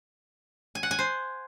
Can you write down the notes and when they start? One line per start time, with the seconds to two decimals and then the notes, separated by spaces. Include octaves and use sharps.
0.75 G#5
0.83 F#5
0.91 G#5
0.99 C5